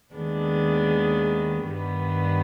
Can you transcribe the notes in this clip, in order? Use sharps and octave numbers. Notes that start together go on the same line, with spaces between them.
D#2 D#3 G#3 B3 D4
G2 D#3 G3 B3